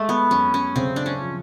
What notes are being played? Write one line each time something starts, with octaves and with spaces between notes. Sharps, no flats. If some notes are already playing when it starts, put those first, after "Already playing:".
Already playing: G#3 A3
B3
F#2 C#4
C#4
C#3 C4
D4
C#4
F3